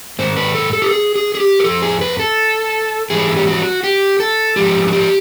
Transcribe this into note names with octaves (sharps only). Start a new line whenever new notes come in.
G#2 D#3 C5
B4
A4
A4
G4
G#4
G#4
G#4
G4
A#4
F2 C#3 F3 A4
G#4
B4
A4
G#2 E3 G3 G#4
G4
F#4
G4
A4
G#2 F3 G#3 G4
F#4
G4